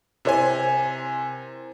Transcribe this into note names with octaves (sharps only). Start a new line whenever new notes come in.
C3 E4 A#4 C5 G#5